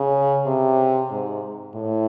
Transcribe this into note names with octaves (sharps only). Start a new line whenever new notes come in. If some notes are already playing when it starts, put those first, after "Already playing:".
Already playing: C#3
C3
G#2
A2